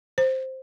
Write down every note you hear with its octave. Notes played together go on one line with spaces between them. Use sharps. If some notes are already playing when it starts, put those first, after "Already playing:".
C5